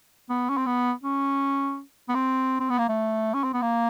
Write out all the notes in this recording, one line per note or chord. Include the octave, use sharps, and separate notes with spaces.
B3
C#4
C4
B3
C#4
B3
C4
C4
B3
A#3
A3
C#4
C4
B3
A#3